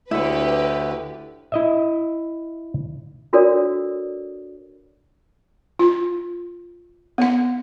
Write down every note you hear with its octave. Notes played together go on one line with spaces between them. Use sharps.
D2 D3 E4 G4 B4 C#5
E4 D#5 E5
D4 F#4 A4 A#4 C#5 D5
F4
B3 F#5